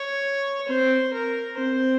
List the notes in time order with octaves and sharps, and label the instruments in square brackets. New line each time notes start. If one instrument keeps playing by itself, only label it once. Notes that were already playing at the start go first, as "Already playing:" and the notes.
Already playing: [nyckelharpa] C#5
[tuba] C4 [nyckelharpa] C5
[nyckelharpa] A#4
[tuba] C4 [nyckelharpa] C5